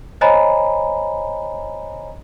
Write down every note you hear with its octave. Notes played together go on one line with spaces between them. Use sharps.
C5 C#5 D#5 G#5 A#5 B5